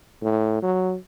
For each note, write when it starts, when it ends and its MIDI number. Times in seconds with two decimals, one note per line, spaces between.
0.22 0.60 45
0.63 0.95 54